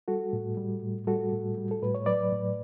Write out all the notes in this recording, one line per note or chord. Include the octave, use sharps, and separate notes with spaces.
G3 F#4 A4
A2
G3
A2
G3 F#4 A4
A2
G3
A4
A2 B4
C#5
F#3 B4 D5
A2